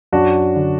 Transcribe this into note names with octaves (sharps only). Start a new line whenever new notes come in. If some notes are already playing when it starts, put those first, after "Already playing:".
F#2 D4 F#4
D3